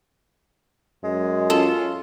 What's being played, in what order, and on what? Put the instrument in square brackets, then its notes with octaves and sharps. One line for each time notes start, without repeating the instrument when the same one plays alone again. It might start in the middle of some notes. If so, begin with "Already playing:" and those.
[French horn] F#2 [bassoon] G#3
[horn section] C#4 F4 [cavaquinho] A4